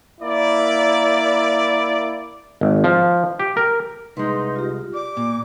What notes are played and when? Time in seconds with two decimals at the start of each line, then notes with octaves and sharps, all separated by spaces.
0.21 A#3 E4 D5
2.61 G#1
2.84 F3
3.39 G4
3.57 A#4
4.17 C2 G#3 D#4 B4 C6
4.56 F4 G4
4.94 D5 D6
5.17 A#2